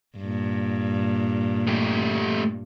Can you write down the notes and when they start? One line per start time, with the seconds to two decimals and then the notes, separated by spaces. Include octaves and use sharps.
0.18 G2 A#2
1.67 A3 G4